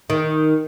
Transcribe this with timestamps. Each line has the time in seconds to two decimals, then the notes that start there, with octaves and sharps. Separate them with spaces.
0.10 D#3